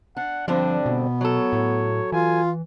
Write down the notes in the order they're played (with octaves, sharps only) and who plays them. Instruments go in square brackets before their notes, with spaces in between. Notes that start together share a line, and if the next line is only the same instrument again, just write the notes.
[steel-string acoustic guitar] D4 [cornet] F#5
[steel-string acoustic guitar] G2 D3 C4 [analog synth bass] F3 [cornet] D4
[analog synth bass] B2 [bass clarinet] B3
[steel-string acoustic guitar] F#3 A4 [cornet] C#5
[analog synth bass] A2
[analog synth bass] E3 [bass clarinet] F4 [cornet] G#5